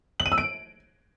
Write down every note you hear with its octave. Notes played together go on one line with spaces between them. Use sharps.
F#7
D#7
E6
D7